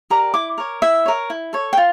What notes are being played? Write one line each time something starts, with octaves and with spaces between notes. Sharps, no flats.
G4 A#4 D5 A#5
E4 D6
A#4 C#5
E4 E5
A#4 C#5
E4
A4 C#5
G5
F4